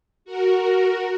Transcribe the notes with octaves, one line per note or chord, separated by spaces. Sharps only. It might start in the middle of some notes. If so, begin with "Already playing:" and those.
F#4 A#4